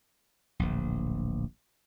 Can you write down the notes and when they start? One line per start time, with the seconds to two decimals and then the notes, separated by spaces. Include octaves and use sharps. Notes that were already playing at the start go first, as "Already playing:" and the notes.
0.59 D1 A#1